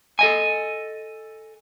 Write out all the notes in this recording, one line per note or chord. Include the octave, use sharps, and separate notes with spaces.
A4 D#5 G#5